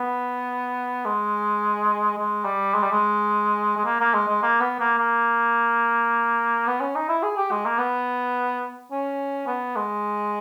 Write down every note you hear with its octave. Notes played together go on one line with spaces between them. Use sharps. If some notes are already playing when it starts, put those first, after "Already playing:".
Already playing: B3
G#3
G#3
G3
G#3
G3
G#3
G#3
A#3
A#3
G#3
G#3
A#3
B3
A#3
A#3
B3
C#4
D#4
E4
G#4
G4
G#3
A#3
B3
C#4
B3
G#3